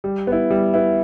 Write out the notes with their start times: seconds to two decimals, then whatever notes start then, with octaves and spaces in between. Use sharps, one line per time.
0.04 G3
0.27 B3 E4
0.50 G3
0.74 B3 E4